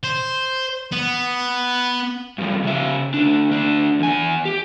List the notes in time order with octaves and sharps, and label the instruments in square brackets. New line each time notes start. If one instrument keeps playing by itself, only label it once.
[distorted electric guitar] C5
B3
[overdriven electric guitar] G2 F3
C#3 E5
D2 D4
D2 D4
E2 G#5
G4